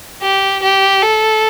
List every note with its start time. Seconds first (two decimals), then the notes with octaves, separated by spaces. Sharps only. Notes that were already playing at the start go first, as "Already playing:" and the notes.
0.22 G4
0.63 G4
1.02 A4